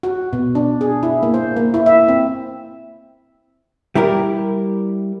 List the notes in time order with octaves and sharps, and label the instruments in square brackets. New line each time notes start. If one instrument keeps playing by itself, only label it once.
[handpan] F#4
B2
D4
G#4
E4
A#3
C5
A#3
E4
E5
C4
[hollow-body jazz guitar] G3 E4 G4 A#4